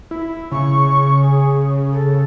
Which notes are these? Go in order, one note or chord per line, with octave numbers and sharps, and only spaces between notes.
E4
C#3 C#6
G#4
A4